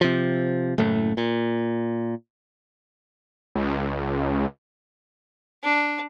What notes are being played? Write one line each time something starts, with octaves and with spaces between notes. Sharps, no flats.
C3 F3
F#1 A2 A3
A#2
C#2
D4